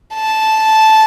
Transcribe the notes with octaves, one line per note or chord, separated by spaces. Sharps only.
A5